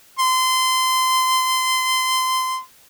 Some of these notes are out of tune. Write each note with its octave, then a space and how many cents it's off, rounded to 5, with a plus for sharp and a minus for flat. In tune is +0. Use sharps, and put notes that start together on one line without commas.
C6 -20